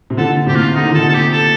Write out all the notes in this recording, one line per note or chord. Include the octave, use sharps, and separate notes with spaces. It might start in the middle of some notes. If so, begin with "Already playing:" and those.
C3
A#2 D3 A4
A2 C3 G4
F4
D3 D#4
D#3
A#2 D3 A4
A4
G4
A4